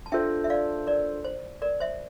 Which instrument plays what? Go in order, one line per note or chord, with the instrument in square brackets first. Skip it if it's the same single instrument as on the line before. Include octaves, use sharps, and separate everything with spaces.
[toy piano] A5
[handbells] D4 F4 A4 C5 [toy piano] E5 G5
[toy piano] E5
D5 F5
A#4 D5
C5
A#4 D5
C5 E5